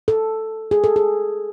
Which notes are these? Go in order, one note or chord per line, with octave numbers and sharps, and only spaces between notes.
A4
G#4
A4
G#4